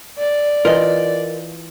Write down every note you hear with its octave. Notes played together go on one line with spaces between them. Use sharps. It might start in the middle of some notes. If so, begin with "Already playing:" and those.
D5
E3 F4 A#4 D#5